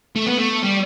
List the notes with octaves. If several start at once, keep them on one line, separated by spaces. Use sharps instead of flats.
A3
B3
A3
G3